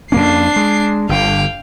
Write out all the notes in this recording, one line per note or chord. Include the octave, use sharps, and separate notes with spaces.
F2 A#3 C#4 D4 C7
G#3
G1 D3 F5 G5